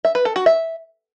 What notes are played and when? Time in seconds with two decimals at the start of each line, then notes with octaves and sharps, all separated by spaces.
0.05 E5
0.15 B4
0.25 A4
0.36 F#4
0.46 E5